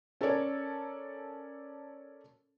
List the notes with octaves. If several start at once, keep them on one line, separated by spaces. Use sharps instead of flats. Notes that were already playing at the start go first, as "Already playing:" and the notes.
C#4 A4 A#4 C#5 D5